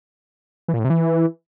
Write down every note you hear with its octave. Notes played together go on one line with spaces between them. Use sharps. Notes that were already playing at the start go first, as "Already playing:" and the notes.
E3
A#2
A2
C3
E3